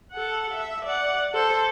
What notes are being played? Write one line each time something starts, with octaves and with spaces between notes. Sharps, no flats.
A4 F#5
E5
D5 F#5
A4 C5